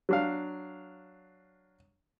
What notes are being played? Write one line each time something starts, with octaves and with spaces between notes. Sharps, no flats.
F#3 D4 F5